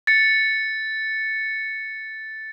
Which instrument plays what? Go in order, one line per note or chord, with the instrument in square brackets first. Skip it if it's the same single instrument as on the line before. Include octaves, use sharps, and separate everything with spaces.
[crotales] A6 C#7